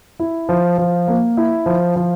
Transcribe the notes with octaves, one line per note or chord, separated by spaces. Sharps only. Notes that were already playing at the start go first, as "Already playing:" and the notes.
E4
F3
F3
A#3
E4
F3
F3